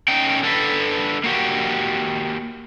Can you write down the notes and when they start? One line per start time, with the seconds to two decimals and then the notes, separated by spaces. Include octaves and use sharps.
0.08 C#4 D#4 G5
0.43 D3 A4 B4
1.24 A#3 F#4 G4